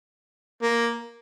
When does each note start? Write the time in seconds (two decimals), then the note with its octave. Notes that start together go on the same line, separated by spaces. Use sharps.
0.62 A#3